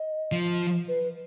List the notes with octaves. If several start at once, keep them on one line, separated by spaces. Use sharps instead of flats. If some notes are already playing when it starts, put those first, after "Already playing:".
Already playing: D#5
F3
B4